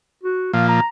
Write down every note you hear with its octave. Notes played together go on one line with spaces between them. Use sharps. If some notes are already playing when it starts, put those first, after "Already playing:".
F#4
A#2 F3 F5
A#5